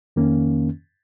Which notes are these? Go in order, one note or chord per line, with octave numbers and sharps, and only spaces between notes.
F2 D#3 A#3 C#4